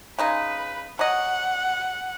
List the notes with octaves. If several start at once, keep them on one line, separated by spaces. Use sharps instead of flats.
C#3 G#3 D#4 B4
F#3 D#5 F#5